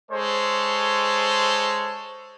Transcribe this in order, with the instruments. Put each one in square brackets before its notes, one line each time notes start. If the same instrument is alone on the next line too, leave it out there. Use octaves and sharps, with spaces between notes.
[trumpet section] G#3 A4 C5 C#5